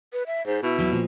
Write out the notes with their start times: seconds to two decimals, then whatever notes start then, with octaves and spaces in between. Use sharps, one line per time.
0.13 B4
0.27 E5
0.46 G#2 C5
0.63 B2 E4
0.79 E2 F#3
0.92 A#2 F3